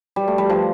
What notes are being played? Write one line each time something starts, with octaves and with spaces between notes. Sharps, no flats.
G3
A3
G3
F3